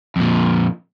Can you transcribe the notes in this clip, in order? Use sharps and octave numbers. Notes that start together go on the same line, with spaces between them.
F2 A#2